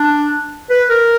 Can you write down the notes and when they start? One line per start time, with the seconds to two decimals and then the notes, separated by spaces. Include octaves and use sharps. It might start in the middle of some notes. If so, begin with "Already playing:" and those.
Already playing: D4
0.70 B4
0.89 A#4